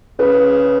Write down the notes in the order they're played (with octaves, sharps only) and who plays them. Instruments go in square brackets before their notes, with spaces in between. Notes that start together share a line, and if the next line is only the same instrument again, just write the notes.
[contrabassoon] C#3 [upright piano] B4